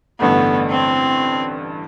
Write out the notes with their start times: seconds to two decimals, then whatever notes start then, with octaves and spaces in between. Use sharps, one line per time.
0.20 A1 G2 D3 A3 B3
0.71 C4